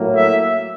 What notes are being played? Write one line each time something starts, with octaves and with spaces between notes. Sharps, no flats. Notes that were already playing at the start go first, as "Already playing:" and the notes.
Already playing: A2 F#3 A#3
E5